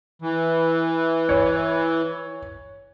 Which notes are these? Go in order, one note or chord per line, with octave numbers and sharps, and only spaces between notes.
E3
C#5